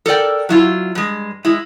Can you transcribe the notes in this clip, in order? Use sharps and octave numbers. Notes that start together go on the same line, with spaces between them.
A4 A#4 D5 G5
F#3 E4 F4
G2 G#3
G#3 E4